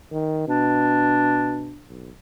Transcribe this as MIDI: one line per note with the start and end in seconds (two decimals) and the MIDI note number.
0.12 0.44 51
0.48 1.80 47
0.48 1.83 62
1.88 2.10 35